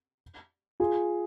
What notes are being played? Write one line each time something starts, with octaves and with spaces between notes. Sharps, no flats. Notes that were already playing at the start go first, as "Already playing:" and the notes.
F4 G#4